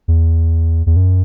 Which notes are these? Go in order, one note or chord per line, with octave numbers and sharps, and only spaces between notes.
E2
E2
F#2